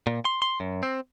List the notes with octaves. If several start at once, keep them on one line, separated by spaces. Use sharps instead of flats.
A#2
C6
C6
F#2
C4